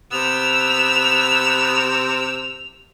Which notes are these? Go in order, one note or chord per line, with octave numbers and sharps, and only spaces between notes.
C3 B3 E6 F7